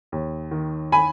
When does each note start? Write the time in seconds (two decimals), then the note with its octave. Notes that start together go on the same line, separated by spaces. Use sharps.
0.12 D#2
0.51 D#3
0.92 G#5 B5